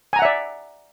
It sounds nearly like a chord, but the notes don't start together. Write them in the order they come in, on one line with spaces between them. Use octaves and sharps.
G#5 A#5 F#5 E5 D5